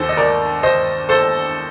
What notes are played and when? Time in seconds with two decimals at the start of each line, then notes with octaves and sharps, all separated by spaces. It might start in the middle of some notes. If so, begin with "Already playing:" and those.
Already playing: D#2 D#3 A4 C5
0.09 D#5
0.17 A#4 D5
0.63 C5 D#5
1.09 A4 C5